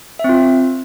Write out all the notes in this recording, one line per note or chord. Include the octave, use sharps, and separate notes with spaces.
C4 F4 E5